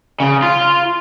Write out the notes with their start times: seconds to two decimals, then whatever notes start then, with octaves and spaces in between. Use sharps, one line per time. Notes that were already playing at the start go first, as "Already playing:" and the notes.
0.20 C#3
0.43 F4